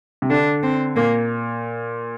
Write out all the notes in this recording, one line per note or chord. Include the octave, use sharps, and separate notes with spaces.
C3
D3 D4
C4
A#2 A#3